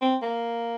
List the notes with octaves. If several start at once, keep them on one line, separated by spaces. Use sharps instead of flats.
C4
A#3